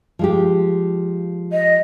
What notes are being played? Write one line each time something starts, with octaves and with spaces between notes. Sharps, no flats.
F3 G#3 G4
D#5